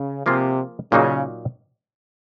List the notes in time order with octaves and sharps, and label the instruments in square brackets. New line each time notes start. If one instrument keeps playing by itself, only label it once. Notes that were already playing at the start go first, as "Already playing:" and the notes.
Already playing: [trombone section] C#3
[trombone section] C3 [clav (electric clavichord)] F3 A#3 F4 G#4
[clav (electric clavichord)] A#2 F#3 A#3 D#4 F#4 [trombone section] C#3